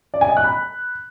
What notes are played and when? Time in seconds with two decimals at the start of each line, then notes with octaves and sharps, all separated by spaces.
0.14 D5
0.21 G#5
0.29 D#5
0.37 F#6
0.44 B5